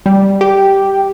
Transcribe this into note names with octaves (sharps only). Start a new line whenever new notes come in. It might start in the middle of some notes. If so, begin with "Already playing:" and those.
G3
G4